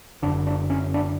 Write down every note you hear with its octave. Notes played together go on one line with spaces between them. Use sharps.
F#1 F#2 D3 D4
D4
C#4
D4